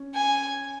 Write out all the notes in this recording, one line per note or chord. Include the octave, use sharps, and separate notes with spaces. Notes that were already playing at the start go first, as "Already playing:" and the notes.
Already playing: C#4
G#5